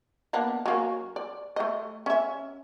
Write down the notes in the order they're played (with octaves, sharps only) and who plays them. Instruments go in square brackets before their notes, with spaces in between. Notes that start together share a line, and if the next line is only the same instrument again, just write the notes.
[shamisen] A#3 B3 D4
F#3 A#3 C#4
D5
A3 D#5
C#4 E5